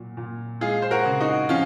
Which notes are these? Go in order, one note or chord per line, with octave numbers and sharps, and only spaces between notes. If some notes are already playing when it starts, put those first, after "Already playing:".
Already playing: A#2 F#3
A#2
G#3 F4 G#4
C5
F#4 A#4
C#3
D#4 F#4
F3 C#4 F4